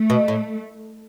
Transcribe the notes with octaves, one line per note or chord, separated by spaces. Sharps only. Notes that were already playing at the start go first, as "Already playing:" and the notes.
Already playing: A3
B2
A2